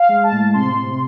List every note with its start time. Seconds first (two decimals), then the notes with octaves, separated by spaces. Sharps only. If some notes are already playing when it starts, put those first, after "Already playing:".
Already playing: F5
0.09 G#3
0.24 A5
0.31 A2
0.54 C3 C6
0.77 C3